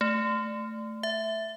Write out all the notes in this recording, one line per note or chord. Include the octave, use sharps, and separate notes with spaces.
A3
E5